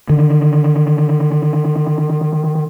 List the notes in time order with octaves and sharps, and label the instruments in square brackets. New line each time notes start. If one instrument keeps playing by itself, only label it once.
[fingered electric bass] D3 D#3